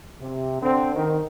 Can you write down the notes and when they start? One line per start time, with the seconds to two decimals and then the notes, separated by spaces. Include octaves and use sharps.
0.20 C3
0.62 D3 C4
0.95 D#3